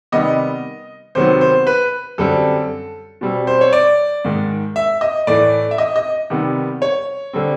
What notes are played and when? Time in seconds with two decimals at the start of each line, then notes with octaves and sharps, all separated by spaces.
0.12 C3 D#3 G3 B3 D#5
1.15 C3 D#3 F#3 B3 C5
1.41 C5
1.67 B4
2.18 F#2 D3 G3 C4 A4
3.21 B2 G3 C4
3.47 C5
3.61 C#5
3.73 D5
4.25 G#2 D#3 G#3
4.76 E5
5.01 D#5
5.27 A2 E3 A3 D5
5.71 E5
5.78 D#5
5.96 D#5
6.30 C3 D#3 G3 B3
6.82 C#5
7.33 D3 G3 C4